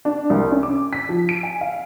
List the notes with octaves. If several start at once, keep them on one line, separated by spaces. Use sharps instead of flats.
D4
C2
C#4
D6
B6
F3
D7
G#5
F5